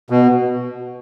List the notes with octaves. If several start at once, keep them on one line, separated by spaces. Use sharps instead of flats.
B2